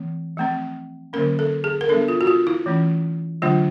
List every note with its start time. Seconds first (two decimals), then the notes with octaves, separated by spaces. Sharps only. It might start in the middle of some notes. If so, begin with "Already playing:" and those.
Already playing: E3 A3 C4
0.37 F3 A3 C4
1.13 D3 F#3 A#3 C#4 A#4
1.39 A4
1.64 G#4
1.81 A#4
1.89 G3 B3 D4 A4
2.08 F4
2.21 F#4
2.27 F4
2.47 E4
2.66 E3 A3 C#4
3.42 D3 F#3 A3 D4 F4